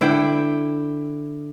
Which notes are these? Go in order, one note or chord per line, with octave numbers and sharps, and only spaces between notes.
D3 E4 G5